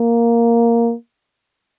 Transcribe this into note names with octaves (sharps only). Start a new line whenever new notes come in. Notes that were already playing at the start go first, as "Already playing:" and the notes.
Already playing: A#3